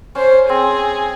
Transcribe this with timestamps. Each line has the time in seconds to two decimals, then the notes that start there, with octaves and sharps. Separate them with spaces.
0.15 C#4 C5
0.49 C4 G#4